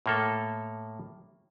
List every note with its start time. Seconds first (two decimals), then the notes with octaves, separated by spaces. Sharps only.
0.06 A2 A#3 A4